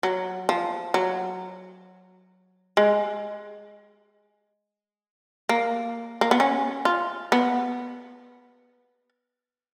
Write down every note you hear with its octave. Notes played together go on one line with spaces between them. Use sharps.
F#3
F3
F#3
G#3
A#3
A#3
B3
C#4
F4
B3